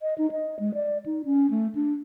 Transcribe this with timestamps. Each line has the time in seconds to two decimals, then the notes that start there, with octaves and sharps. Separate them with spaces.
0.02 D#5
0.18 D#4
0.31 D#5
0.60 G#3
0.74 D5
1.06 D#4
1.25 C#4
1.51 A3
1.75 D4